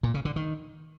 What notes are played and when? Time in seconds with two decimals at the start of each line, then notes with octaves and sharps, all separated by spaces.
0.03 A#2
0.14 C#3
0.25 D3
0.36 D#3